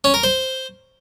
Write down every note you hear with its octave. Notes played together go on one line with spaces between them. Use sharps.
C#4
A#4
C5